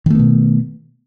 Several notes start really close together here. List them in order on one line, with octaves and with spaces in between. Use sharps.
D#3 A3 B3 B2